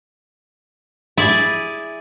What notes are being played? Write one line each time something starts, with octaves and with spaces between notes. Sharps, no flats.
E4 G#4 D5